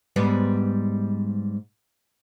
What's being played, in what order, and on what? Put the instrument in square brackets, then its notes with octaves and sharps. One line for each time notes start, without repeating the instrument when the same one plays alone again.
[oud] G#2 G3 B3